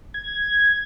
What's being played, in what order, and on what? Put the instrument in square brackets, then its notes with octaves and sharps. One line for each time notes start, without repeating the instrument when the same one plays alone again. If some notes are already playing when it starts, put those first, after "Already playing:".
[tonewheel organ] G#6